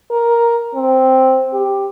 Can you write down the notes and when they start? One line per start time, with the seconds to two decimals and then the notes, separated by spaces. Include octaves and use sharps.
0.11 A#4
0.75 C4
1.53 G4